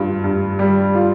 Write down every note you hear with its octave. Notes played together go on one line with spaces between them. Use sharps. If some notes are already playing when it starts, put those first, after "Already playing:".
Already playing: G2 F4
G2
G3
F4